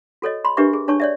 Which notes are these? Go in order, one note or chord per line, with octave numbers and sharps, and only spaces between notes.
F#4 A4 C#5 D#5
B5 C6
D4 G4 A#4 B4 E5 C#6
G#4
D4 C#5 A5 C#6
C#5 D5 E5